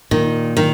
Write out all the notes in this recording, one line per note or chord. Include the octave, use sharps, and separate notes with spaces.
A#2 D#3
D#3